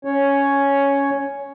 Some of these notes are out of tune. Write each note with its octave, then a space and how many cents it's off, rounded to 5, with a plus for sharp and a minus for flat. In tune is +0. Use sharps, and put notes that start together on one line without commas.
C#4 +5 C#5 +0